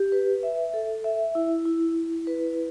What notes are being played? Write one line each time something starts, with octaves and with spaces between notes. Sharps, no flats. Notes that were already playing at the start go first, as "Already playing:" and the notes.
Already playing: G4
B4
E5
A4
E5
E4
E4
E4
B4